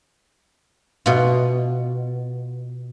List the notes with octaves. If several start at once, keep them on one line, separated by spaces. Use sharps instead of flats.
B2 F4